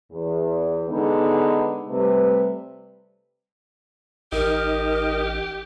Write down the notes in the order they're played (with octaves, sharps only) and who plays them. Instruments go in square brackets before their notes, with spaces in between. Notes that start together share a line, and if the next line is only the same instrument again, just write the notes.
[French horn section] E2
D3 G#3 B3 D#4
C3 G3 A3 B4
[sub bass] A1 [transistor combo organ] D#4 D#5 [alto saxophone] G4 [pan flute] A#4